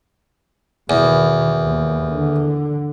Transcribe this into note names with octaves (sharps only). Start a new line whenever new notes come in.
E2 B2 D#3
D#2
D3